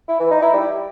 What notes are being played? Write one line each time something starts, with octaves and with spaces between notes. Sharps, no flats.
E4
E3
D#4
E4
G3